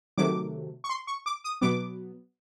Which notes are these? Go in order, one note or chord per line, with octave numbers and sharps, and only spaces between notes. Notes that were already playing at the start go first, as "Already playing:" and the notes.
C3 D#3 F#3 A3 D6
C#6
C6
C#6
D6
D#6
B2 F#3 B3 D6